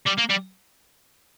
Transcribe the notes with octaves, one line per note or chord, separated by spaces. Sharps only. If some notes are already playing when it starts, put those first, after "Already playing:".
G3
A#3
G3